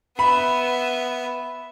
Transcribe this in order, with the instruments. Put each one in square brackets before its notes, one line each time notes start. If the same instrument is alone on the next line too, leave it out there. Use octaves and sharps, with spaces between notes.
[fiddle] B3 E5 [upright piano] B5